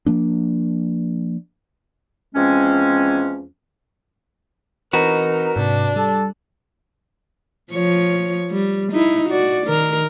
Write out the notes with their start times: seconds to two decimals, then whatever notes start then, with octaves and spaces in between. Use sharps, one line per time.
0.06 F3 A#3 D4
2.35 E2 F3 G#3 C4 C#4
4.93 E3 C4 D#4 F#4 A#4 B4
5.56 G#2 C3 D4
5.96 G3 A4
7.72 F3 C#5
8.51 G3
8.93 D#4 E4
9.29 F#4 D5
9.67 D#3 A#4